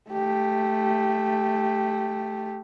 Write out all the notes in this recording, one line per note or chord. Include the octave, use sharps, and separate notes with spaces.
A3 G4